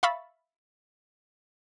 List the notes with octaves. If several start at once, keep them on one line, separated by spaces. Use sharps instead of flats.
E5 F5 B5 C#6 E6 A6